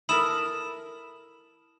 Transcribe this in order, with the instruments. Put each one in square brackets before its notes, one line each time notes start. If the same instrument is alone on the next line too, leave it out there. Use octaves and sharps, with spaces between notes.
[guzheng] E4 A4 A#4 [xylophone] B5 D#6 E7